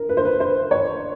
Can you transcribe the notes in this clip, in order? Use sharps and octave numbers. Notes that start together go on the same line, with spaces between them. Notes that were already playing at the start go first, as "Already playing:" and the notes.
Already playing: A#4
B4
C5
B4
C5
C#5